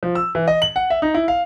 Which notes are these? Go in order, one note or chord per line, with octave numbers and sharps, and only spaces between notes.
F3
E6
E3
D#5
F#7
F#5
E5
D#4
E4
F5